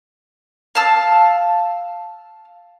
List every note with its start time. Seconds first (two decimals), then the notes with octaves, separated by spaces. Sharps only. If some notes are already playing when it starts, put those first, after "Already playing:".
0.75 F5 A5 E6